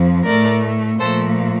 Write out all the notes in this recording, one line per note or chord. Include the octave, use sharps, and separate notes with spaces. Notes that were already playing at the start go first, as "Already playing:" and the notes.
Already playing: F2 F3
A2 A3 A#4 D5
A#2 F3 A3 A4 C5